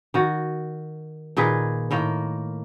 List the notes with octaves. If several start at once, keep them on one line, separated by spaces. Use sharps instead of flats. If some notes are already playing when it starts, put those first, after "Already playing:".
D#3 F#4
A#2 D#3 G#4 B4
A2 D#3 A#3